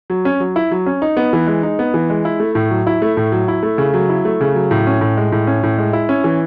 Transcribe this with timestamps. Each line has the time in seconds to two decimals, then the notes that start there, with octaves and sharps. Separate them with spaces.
0.10 F#3
0.25 C#4
0.40 F#3
0.56 E4
0.71 F#3
0.86 C#4
1.02 D#4
1.17 B3
1.33 E3
1.47 G#3
1.63 D#4
1.79 B3
1.94 E3
2.10 G#3
2.25 E4
2.40 A3
2.55 A2
2.70 F#3
2.87 E4
3.02 A3
3.17 A2
3.32 F#3
3.48 E4
3.63 A3
3.78 C#3
3.94 F#3
4.09 E4
4.25 A3
4.41 C#3
4.55 F#3
4.71 A2
4.87 C#4
5.01 A2
5.17 G#3
5.32 A2
5.47 C#4
5.63 A2
5.78 G#3
5.93 E4
6.09 C#4
6.24 E3